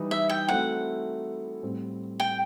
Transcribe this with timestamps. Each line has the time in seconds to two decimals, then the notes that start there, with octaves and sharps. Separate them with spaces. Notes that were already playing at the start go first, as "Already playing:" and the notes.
Already playing: E3 G3 D#4
0.11 E5
0.30 G5
0.48 F#3 A3 C4 E4 F#5
1.63 A2 G3 C4
2.20 G5